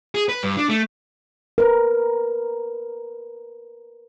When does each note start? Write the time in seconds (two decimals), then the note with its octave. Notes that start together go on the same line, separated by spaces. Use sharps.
0.15 G#4
0.29 B4
0.43 G2
0.57 D4
0.69 A3
1.58 A#4 B4